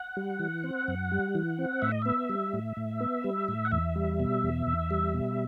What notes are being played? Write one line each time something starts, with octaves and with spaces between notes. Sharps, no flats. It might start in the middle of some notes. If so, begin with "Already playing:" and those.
Already playing: F#5
G3
E3
C4
F#2
G3
E3
C4
A2 E5
D#5
B3 E5
G3
A2
A2
B3
G3
A2
F#5
E2 E5
G3
B2
E2
E2
G3
B2